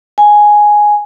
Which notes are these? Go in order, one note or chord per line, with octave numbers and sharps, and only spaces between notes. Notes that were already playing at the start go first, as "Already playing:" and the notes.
G#5